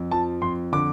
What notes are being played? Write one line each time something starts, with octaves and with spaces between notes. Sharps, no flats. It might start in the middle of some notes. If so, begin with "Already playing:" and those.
Already playing: F2
F3 A5
F2 C6
D3 D6